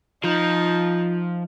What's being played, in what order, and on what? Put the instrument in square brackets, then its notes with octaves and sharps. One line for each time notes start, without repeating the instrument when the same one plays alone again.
[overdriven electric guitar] F3 [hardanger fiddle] D#4 [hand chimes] F4 G6